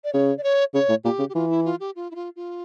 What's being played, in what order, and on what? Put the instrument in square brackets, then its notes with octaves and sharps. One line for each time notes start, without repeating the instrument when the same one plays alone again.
[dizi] D5
[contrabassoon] C#3 [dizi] C#5
[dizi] D5
C#5
[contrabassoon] C#3 [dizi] C#5
[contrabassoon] A2
[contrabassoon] A#2 [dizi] G4
[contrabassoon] C#3
[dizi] G4
[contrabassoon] E3 [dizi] F4
[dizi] E4
F4
G4
F4
E4
F4
F4